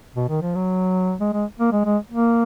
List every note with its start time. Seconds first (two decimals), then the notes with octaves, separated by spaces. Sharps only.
0.16 B2
0.29 D#3
0.42 F3
0.55 F#3
1.20 G#3
1.33 G#3
1.60 A#3
1.72 G#3
1.86 G#3
2.12 A#3